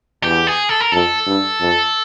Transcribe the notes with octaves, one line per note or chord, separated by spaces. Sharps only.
E2 G4
G#4
A4
A#4
F2 A4
G2
F2